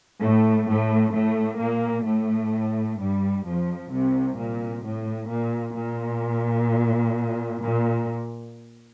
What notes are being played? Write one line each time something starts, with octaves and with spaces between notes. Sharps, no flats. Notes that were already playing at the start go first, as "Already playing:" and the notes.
A2 A3
A2 A3
A2 A3
A#2 A#3
A2 A3
G2 G3
F2 F3
C2 C3
A#2
A2
A#2
A#2
A#2